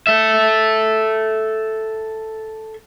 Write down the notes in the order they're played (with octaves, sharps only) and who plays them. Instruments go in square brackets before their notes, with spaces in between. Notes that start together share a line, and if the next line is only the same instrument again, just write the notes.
[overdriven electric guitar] A4 E5